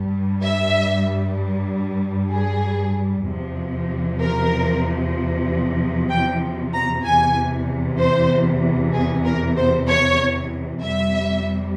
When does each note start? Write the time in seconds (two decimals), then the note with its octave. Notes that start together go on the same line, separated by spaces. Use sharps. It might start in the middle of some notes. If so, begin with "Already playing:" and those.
Already playing: G2 G3
0.42 E5
2.31 G#4
3.26 E2 C3 F3
4.20 A#4
6.09 G5
6.73 A#5
7.04 E2 C3 E3 G#5
7.98 C5
8.93 G#4
9.24 A#4
9.56 C5
9.87 C#5
10.82 F2 C3 G3 E5